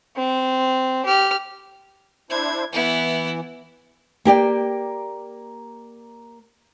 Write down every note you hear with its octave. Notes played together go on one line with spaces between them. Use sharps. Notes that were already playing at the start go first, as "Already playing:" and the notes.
C4
G4 F6
D4 E4 C5 G#6
E3 B3 E4
A#3 G4 D5 G5